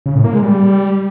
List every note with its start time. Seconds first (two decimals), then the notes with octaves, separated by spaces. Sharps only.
0.06 C#3
0.15 A2
0.24 A#3
0.33 G#3
0.43 G3